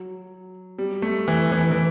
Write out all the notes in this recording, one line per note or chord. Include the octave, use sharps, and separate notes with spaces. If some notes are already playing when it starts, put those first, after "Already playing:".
Already playing: F#3
G3
A3
E3
E3
E3